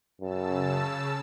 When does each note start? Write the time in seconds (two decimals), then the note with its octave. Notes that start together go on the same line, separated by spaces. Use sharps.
0.21 F#2 C#3 A5 E6